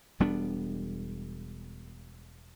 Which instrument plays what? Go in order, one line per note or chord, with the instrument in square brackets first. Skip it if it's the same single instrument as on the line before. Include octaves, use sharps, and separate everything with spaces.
[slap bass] E1 G3 B3 D4